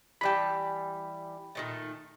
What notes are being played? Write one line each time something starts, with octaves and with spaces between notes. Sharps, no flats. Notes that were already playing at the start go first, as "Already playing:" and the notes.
E3 G3 G5 A5 B5
A#2 D#3 A3